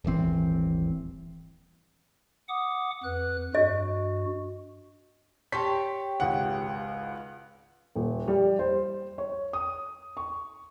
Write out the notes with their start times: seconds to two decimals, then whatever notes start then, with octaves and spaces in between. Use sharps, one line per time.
0.05 D#1 G#1 E3 C4
2.49 F#5 D6 D#6
3.04 F2 B4 F#6
3.55 G2 F#4 D#5
5.52 G4 C#5 A5 C6 B6
6.20 G#1 C#2 F#5
7.96 D#1
8.28 G3
8.59 C5
9.18 C#5
9.53 D#6
10.17 C#6